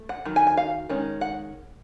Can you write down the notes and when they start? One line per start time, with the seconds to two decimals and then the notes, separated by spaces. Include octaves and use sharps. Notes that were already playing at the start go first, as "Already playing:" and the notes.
Already playing: A3
0.09 F#5
0.25 D#3 F#3
0.36 G#5
0.47 G#5
0.57 F5
0.89 D#3 G#3 C#4
1.21 F#5